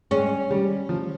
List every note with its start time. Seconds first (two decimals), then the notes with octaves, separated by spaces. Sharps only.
0.11 G#3 C#4
0.50 G3
0.89 F3